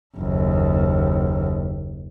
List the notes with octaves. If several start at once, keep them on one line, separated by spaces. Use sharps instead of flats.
F#1 D#2